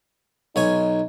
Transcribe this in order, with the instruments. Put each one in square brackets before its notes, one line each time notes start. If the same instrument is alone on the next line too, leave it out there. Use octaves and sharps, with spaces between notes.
[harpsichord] B1 C#5 G#5 [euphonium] D#4